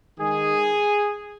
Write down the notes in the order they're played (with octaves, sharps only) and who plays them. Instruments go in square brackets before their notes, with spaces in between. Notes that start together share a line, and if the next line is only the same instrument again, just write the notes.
[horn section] D#3 G#3 G#4